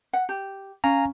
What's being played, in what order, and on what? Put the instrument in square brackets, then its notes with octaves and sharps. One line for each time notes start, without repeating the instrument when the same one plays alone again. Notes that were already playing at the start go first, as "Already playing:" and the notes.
[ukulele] F#5
G4
[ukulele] C#4 [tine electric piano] F5 G#5 A#5